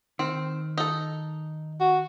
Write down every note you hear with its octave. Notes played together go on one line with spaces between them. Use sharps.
D#3 C4
D#4 A4
F#4